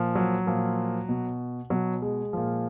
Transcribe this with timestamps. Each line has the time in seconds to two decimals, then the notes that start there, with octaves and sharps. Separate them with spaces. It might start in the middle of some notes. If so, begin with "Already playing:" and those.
Already playing: A#2 F3
0.15 F#3
0.47 A#2 F3
1.09 B2
1.70 B2 F#3
2.02 G#3
2.33 A#2 F3